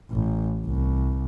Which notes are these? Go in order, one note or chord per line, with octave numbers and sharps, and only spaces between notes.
A1
C2